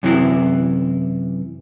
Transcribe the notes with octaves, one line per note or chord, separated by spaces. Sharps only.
F#2 C3 E3 C4 E4